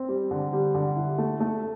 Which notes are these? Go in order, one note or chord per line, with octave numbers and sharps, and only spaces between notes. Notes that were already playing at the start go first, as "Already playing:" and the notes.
Already playing: C4
G3
D3
G3
D3
E4
A3
A3